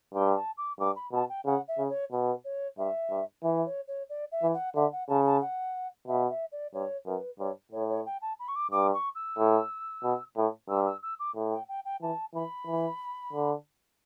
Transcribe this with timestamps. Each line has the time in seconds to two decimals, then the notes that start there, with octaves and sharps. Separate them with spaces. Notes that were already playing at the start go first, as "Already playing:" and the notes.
0.14 G2 G5
0.36 A5
0.57 D6
0.79 G2 D6
0.95 B5
1.12 B2 A5
1.29 G5
1.46 C#3 F#5
1.68 E5
1.78 C#3
1.89 C#5
2.12 B2 B4
2.44 C#5
2.78 G2 E5
3.10 G2
3.43 E3 E5
3.65 C#5
3.88 C#5
4.09 D5
4.32 E5
4.43 E3
4.54 F#5
4.75 D3 E5
4.92 F#5
5.08 C#3 A5
5.25 A5
5.41 F#5
6.08 B2 E5
6.30 E5
6.52 D5
6.74 G2 C#5
7.06 F#2 B4
7.39 G2 C#5
7.72 A2 C#5
7.89 C#5
8.06 G5
8.21 A5
8.39 B5
8.48 C#6
8.56 D6
8.71 G2 D6
8.94 C#6
9.15 E6
9.38 A2
10.03 B2
10.37 A2
10.69 G2 E6
10.86 E6
11.03 E6
11.19 D6
11.35 A2
11.52 G5
11.68 G5
11.85 G5
12.01 E3 A5
12.34 E3 B5
12.67 E3
13.33 D3